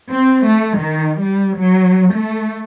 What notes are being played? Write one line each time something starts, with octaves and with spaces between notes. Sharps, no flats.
C4
A3
D#3
G3
F#3
A3